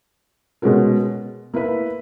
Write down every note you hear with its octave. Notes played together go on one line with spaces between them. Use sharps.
B2 G#3 C#4 F#4 A#4
A#3 E4 B4